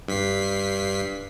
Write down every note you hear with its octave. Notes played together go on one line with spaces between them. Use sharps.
G2 B6 C7